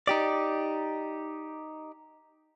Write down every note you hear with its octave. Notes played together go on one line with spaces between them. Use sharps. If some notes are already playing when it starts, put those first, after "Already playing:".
D#4 G4 D5